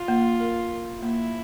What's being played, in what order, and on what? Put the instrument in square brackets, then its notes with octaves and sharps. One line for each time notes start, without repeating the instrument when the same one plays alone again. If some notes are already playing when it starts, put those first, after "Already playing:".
Already playing: [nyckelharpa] F4
[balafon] A#3
A#4
A#4
[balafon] A#3 [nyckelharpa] E4